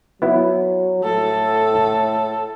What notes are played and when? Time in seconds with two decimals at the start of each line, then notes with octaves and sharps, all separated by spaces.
0.22 F#3 B3 E4
1.04 A2 A4